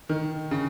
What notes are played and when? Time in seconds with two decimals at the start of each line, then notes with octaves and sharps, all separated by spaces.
0.09 D#3
0.51 C#3